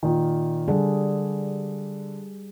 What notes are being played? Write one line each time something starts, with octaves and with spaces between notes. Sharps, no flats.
A#2 D#3
D3 G3 G#4